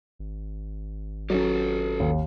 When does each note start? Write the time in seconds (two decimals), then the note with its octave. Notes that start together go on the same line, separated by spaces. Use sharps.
0.19 G#1
1.30 F#3 C#4 G4 A4
2.00 D#2